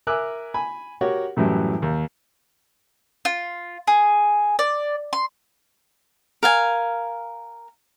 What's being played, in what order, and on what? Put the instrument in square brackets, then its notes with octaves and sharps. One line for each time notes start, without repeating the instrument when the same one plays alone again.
[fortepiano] A#4 E5 G#5 D6 E6 F#6
G#5 B5
F#4 G4 A#4 C#5 F#5
F#2 A2 E3 F#3 G3
D#2
[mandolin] F4
G#4
D5
C6
[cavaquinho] A#4 F5 G#5